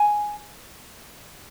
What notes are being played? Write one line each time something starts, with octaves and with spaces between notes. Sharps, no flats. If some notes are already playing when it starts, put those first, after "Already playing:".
Already playing: G#5